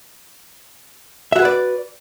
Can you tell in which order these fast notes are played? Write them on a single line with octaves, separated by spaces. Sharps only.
E5 F#4 G#4 B4 D5